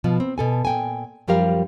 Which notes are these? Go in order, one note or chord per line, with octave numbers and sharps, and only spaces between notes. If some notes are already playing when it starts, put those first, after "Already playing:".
B2 F3
C4
B2 A4 G#5
A#2 G5 G#5
F#2 F3 G3 G4 A#4 F5